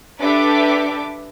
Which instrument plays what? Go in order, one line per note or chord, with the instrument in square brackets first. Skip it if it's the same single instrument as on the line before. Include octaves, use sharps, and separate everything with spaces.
[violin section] D4 G4 A4 B4 E5 D6